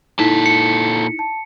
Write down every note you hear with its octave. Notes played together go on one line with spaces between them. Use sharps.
A#2 D#4 E4 A4 B6
C#7
A5